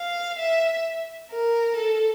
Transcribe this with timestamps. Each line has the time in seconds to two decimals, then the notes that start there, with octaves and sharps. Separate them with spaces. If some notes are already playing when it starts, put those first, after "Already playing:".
Already playing: F5
0.39 E5
1.31 A#4
1.76 A4